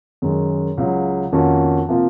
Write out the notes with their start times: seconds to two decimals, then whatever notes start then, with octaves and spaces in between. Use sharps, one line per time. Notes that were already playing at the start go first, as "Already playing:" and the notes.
0.22 F#2 D#3 G#3
0.77 C#2 C#3 F#3
1.32 F2 D#3 A#3 C#4 F#4
1.89 C3 F3 A#3 F4